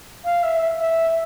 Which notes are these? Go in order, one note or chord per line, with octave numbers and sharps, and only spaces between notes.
F5
E5
E5
E5